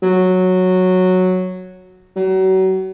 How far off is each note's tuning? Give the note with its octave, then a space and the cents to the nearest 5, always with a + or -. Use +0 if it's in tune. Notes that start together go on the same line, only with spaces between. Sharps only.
F#3 -5
F#3 +35